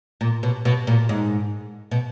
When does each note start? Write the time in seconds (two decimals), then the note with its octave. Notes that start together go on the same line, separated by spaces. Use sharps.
0.21 A#2
0.43 B2
0.65 B2
0.87 A#2
1.09 G#2
1.91 B2